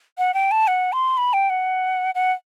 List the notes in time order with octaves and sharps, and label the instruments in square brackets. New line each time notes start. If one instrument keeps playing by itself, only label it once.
[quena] F#5
G5
A5
F#5
C6
B5
G5
F#5
F#5